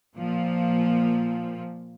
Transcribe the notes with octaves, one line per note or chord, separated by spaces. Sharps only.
A#2 F3